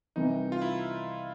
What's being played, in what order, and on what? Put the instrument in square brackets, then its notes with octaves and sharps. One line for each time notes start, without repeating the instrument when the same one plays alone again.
[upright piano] C2 C3 E3 [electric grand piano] D#4
[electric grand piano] F4
E4
E4